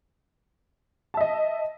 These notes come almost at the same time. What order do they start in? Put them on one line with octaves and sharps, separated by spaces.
A5 E5 D#5